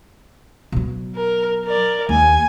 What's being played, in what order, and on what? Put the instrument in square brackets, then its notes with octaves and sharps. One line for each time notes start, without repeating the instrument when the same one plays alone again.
[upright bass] B2 F#3
[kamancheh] A#4
A#4 D5
[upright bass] D#2 [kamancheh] G#5